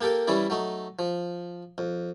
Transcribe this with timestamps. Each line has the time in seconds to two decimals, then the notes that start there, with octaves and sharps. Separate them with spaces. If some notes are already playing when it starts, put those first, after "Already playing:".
0.01 A#3 G4 A4 A#4 G5
0.27 E3 G3 C#4 E4 D5
0.50 F#3 A3 D#4
0.99 F3
1.78 F2